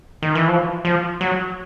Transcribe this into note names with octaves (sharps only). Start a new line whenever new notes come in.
D#3
E3
F3
F3
F#3